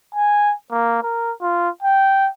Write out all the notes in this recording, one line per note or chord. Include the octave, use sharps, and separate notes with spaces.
G#5
A#3
A#4
F4
G5